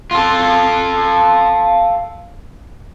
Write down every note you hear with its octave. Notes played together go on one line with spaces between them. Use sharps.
F4 A4